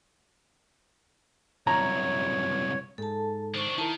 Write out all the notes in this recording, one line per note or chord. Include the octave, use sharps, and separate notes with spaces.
C2 F#2 C#5 A#5
G#2 A4 A5
D#3 D4 C5 C#6
D#3 E4 A#4 A5